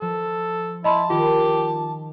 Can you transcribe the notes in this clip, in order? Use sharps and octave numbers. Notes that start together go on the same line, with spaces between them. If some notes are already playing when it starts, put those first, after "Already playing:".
F3 A4
E4 D#5 A5 B5 C6
D#3 F4 G4